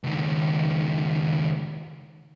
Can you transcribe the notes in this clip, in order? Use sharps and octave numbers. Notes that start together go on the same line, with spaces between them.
C#2 D#3